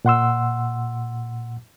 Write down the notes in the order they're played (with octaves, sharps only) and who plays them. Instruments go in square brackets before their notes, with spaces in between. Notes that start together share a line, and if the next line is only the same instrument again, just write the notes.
[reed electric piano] A#2 F#5 C6 E6